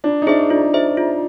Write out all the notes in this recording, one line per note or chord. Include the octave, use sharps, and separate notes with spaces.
D4 F4
D#4
D4 G#4 C5 E5
D4 F4
G#4 C5 E5
F4